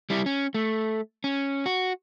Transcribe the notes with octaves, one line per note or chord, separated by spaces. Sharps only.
G3 E4
C#4
A3
C#4
F#4